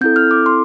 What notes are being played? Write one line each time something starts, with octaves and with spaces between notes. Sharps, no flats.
C4 E4 A4 G6
F6
D6
C6